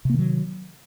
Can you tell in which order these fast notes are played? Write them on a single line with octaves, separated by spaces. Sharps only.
C3 A#3 D#3 F#3